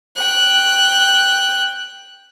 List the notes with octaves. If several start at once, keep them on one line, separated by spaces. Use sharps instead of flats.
G5 F#6